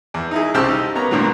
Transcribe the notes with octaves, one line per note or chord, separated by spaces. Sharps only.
E2
D#4 E4 G#4
C2 C#3 G4 C5 A5 E6
D#4
A#3 B3 C#5 A#5
B1 A2 D3 D#3 F#3